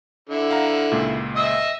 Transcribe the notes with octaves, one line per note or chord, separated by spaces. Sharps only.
D3 E4
F5 F#5 A#5
C#2 A#2
D#5 E5 E6